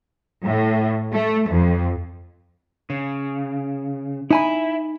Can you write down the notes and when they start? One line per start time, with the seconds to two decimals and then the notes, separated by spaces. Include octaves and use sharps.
0.44 A2
1.12 A3
1.48 F2
2.90 C#3
4.31 D#4 E4 G#5 B5